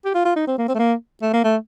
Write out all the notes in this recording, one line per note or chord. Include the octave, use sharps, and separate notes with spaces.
G4
F4
F4
D#4
C4
A#3
C4
A3
A#3
A3
A#3
A3